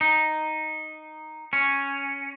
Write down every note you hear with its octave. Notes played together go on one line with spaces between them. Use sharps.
D#4
C#4